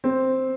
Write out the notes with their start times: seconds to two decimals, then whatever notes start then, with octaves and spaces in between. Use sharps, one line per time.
0.04 C4